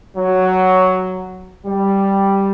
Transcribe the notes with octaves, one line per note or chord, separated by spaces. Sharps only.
F#3
G3